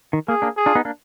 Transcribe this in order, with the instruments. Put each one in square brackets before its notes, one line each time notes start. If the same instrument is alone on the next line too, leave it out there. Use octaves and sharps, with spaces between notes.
[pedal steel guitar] D#3
[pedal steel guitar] A#3 [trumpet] G#4
[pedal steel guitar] A#3 D4
[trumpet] G#4
[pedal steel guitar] D4 F4
B3 D#4
A#3 D4